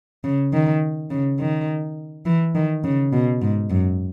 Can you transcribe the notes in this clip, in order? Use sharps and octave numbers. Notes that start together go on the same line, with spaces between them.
C#3
D#3
C#3
D#3
E3
D#3
C#3
B2
G#2
F#2